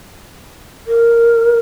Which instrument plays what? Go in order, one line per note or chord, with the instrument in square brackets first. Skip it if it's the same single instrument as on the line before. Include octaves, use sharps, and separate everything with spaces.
[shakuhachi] A#4